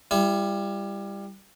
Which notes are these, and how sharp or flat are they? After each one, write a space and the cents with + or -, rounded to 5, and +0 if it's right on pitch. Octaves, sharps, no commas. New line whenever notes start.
G3 +20 E4 +40